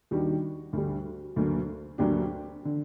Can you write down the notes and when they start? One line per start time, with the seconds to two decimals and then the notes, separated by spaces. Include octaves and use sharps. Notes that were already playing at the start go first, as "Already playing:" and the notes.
0.11 D#2 D#3 G3 D4 F#4
0.73 D2 D3 G3
1.36 D2 D3 F#3 A#3
1.98 D2 D3 F#3 A#3 D4 G4
2.65 D3